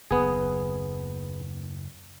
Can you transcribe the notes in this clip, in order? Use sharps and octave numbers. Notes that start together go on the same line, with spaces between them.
F#1 D#2 B3 G#4